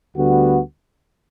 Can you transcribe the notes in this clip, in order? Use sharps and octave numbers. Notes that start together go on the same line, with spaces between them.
D2 D3 G3 B3 F#4